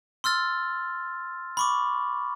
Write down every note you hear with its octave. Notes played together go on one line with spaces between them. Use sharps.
C6 E6 F6 A6
B5 C#6 D6